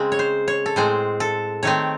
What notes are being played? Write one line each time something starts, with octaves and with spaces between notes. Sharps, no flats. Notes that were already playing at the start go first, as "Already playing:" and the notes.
Already playing: C#3 G#3 C4
C#5
C5
C#5
A4
A2 G#3 C4 C5
A4
D#3 A3 C4 C#5